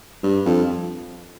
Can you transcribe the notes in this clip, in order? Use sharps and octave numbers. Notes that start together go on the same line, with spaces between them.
G2
F2